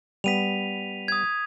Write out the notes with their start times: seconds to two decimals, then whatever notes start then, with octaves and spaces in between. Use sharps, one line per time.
0.24 G3 B3 B6 D#7 F7
1.08 D#6 G#6